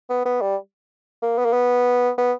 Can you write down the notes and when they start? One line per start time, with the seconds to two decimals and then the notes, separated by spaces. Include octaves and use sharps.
0.09 B3
0.25 B3
0.41 G3
1.22 A#3
1.38 B3
1.45 A#3
1.53 B3
2.18 B3